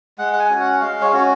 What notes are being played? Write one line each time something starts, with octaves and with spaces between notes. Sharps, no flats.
G#3 F#5
F#5
G#5
C#4 F#4
F#5
G#3 F5
C#5
C#4 F#4 C#5